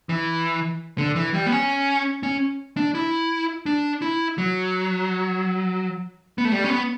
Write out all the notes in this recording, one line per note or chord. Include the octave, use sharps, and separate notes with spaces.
E3
D3
E3
G3
B3
C#4
C#4
D4
E4
D4
E4
F#3
B3
A3
G3
C#4
B3